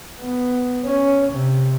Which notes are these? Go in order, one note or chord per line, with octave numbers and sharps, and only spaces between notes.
B3
C#4
C3